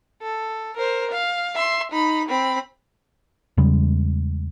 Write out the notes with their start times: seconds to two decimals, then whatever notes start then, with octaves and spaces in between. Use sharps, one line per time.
0.22 A4
0.77 A#4 C5
1.11 F5
1.55 E5 C6
1.92 D#4 B5
2.29 C4 B5
3.57 E2 C#3 G3 G#3